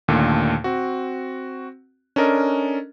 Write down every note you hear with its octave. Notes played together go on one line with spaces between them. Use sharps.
D#2 A#2 D3 A3
C4 F#4
C#4 D4 A4 A#4 D#5